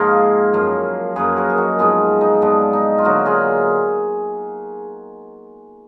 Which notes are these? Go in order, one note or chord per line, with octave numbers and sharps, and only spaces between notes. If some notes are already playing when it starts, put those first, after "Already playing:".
Already playing: G#2 F3 A#3 D#4 F4 G#4
F#2 F3 A#3
F#2 F3 A#3 G#4 B4
F#4 A#4
G#4
D#4 F#4
G#2 F3 B3 F4 G#4
D#4
G#2 F3 B3 D4
D#4
F4
D3 F#3 A#3 D#4 F#4
F4 G#4